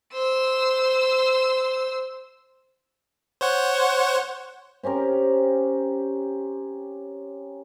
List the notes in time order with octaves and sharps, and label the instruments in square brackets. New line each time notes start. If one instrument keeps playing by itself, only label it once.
[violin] C5 E6
[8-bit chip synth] C5 C#5 F#5
[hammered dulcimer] C4 C#4 G4 A#4